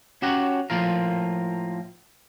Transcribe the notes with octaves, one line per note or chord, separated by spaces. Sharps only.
C#4 F#4 G4 C#5 F#5 A#5
A2 F3 A#3 F4 A#4